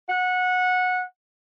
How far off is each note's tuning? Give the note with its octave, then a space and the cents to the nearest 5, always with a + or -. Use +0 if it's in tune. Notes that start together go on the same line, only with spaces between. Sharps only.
F#5 -20